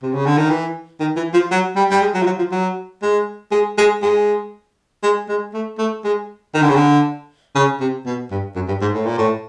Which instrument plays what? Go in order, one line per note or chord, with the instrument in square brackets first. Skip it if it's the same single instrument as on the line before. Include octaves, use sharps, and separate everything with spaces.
[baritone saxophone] C3
C#3
D3
D#3
E3
D#3
E3
F3
F#3
G3
G3
G#3
F#3
F3
F#3
F3
F#3
G#3
G#3
G#3
G#3
G#3
G#3
A3
A3
G#3
D#3
D3
C#3
D3
C#3
C3
B2
G2
F#2
G2
G#2
A2
A#2
A2